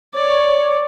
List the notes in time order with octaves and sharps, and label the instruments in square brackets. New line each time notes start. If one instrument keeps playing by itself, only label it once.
[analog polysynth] C#5 [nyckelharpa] D5